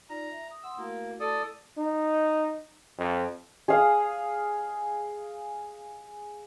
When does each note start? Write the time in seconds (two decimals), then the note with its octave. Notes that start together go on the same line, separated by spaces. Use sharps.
0.10 D#4 F4 D5 A#5
0.31 E5
0.51 D#6
0.63 F#5 C6 D#6 E6
0.78 A3 A#3 E4 F#4
1.20 A4 D5 D#6
1.78 D#4
2.98 F2
3.68 G#4 F5 D#6